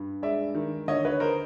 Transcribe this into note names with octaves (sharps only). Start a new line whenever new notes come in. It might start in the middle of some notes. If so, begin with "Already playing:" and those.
Already playing: G2
G#3 D5 E5
D#3
D3 C#5 D#5
B4 C#5
A#4 C5